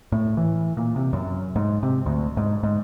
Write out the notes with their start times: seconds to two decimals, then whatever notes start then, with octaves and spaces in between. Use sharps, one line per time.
0.12 A2
0.37 E3
0.77 A#2
0.96 C3
1.13 F#2
1.56 G#2
1.83 C3
2.06 D2
2.37 G#2
2.63 G#2